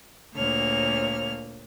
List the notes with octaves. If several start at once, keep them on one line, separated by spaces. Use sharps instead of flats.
D2 A#2 A#3 C#5 F6